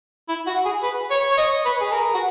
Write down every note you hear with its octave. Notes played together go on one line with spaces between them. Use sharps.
E4
F#4
G#4
B4
C#5
C#5
D#5
B4
G#4
A#4
F#4